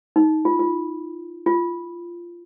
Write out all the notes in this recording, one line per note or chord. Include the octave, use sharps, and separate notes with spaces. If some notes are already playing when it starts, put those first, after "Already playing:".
D#4
F4
F4
F4